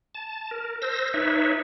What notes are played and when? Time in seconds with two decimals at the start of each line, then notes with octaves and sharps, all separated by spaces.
0.15 A5
0.51 A#4
0.82 C5 E6 A#6
1.14 D#4 B4 C#5 E5